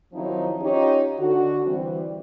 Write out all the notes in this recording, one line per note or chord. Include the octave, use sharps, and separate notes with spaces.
D#3 F3 F#3 C4 D#4 E4
C#4 D#4 F4 G4 C#5
D3 F#4
E3 G3 C4